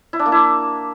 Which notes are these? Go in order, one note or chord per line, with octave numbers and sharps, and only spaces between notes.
E4
D4
A#3
E4